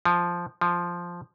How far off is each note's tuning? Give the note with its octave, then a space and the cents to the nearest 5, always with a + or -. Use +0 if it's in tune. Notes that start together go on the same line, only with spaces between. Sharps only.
F3 +0
F3 +0